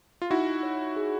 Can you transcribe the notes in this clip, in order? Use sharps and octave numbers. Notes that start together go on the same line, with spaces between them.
F4
D#4 E4 F#4
C#5
G#4